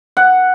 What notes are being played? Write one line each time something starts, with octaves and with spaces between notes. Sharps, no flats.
F#5